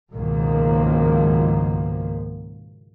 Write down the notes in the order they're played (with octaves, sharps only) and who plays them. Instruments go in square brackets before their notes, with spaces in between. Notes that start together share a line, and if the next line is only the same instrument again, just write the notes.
[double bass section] C#2 G#2 B2 D#3 F3 A#3